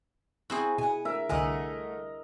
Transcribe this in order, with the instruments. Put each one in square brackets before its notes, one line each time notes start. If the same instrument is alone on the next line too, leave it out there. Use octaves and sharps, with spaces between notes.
[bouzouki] C4 F#4 [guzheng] E4 G#4
[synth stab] B2 [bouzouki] F#5 G#5
[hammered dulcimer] A#4 E5
[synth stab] C2 D3 [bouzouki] A3 F#5 G#5 [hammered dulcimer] A#4 D#5